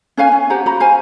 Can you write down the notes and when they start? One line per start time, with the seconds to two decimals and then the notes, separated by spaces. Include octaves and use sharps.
0.17 C#4 B4 F5 G#5
0.32 C#4
0.50 G4 C5 F#5 A#5
0.66 F#4 A#5 B5
0.80 C5 F5 G#5